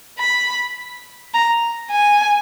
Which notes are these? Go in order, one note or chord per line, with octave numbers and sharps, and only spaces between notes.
B5
A#5
G#5